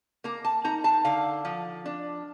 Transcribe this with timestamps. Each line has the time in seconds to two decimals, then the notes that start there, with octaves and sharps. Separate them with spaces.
0.24 A#3 A#5
0.45 A5
0.64 D#4 A#5
0.84 A5
1.05 D3 F5
1.45 F3
1.86 D4